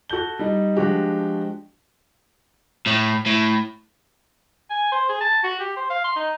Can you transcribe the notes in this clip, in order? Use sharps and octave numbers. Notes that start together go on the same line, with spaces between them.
F#4 A4 G6 G7
G3 D#4
F3 G#3 D4 F#4 G4
A2
A2
G#5
C5
G#4
A5
F#4
G4
C5
F5
C6
D#4